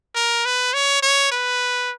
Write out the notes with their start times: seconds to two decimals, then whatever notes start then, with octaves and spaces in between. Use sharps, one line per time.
0.15 A#4
0.45 B4
0.73 C#5
1.02 C#5
1.32 B4